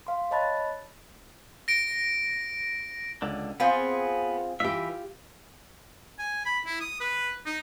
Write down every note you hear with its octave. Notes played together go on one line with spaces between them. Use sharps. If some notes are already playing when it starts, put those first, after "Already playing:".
F5 C6
C#5 D#5 A5 B5 F#6 A6
A#6 D7
C#2 D3
B3 C4 F4 G#4
E3 F4 G4 E5
G#5
B5
E4
D#6
B4
D#4